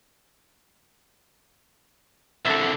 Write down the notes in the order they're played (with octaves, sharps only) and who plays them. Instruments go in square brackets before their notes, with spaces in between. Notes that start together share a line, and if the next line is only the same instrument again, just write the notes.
[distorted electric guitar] C2 D3 [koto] A4 E5